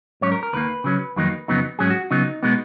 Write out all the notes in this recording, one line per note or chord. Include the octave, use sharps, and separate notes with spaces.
G#2 F#3 C#4 C#5
A#4
A#4
D#2 D#3 A#3 B4
C#3 F#3 C#4
F2 D#3 F#3 A#3 D#4
F2 C#3 F#3 B3 D#4
G#2 F#3 C#4 G#4
F#4
C#3 F#3 B3 D#4
B2 G#3 B3 D#4